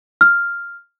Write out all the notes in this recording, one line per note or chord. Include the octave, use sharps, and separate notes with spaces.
F6